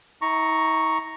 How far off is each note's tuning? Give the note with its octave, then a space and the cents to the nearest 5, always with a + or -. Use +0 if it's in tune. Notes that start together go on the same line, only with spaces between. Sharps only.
E4 -45 A#5 +0 C#6 +0